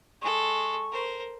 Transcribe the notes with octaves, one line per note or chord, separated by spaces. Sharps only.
G#3 A4 C#6
A#4 C5